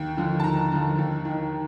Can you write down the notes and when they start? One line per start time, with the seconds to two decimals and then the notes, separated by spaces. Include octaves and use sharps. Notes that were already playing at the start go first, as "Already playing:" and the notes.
Already playing: D#2 G5
0.17 D3 F3
0.40 A5
0.44 D#2 A#5
0.72 D3 F3
0.99 D#2
1.25 D#3